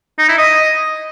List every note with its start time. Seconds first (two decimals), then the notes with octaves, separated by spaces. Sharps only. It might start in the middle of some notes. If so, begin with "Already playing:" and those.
0.18 D#4
0.28 E4
0.38 D#5